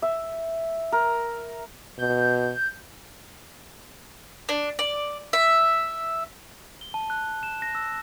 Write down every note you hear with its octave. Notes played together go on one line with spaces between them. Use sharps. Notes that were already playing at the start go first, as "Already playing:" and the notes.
E5
A#4
B2 G6
D4
D5
E5
G7
A5
F#6
E7
A#6
E6